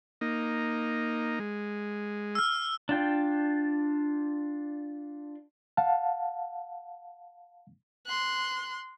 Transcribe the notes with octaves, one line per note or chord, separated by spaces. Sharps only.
A#3 D#4
G#3
E6 F6
D4 F4 G5
F5 F#5 A5
C6 F#6